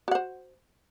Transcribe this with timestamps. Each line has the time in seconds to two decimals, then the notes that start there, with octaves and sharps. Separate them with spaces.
0.08 F#4
0.11 F#5
0.15 C5